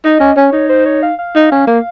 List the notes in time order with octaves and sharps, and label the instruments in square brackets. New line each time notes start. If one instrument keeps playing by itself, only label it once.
[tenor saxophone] D#4 [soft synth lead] D#5
[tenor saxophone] C#4
[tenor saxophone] C#4 [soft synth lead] C#5
[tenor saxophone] D#4
[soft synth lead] C5
C#5
F5
F5
[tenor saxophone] D#4
C#4
A#3